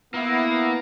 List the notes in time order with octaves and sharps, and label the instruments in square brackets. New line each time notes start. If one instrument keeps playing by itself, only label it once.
[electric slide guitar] A#3 [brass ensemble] B3 [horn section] E4